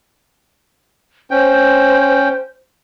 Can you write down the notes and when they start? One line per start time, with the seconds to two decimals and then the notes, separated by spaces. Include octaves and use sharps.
1.31 C#4 C5 G5